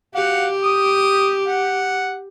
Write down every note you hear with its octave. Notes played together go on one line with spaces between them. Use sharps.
F#4 G4 F5 F#5
D#6
F#5